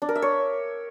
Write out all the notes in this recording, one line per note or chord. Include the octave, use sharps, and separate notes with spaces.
D4
A#4
E5
C#5